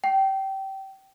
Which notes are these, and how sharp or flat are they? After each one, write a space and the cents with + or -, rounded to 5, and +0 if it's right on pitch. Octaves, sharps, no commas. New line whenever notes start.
G5 -25